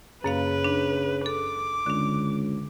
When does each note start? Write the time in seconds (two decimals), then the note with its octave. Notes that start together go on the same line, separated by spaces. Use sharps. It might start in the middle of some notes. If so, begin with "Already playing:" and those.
0.24 F#2 C#3 A#3 B4 F5
0.64 D4
1.26 A4 D6
1.86 C#2 D3 D4